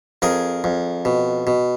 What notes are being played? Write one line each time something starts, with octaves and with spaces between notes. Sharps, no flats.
F2 G#4 A#4
F2
B2
B2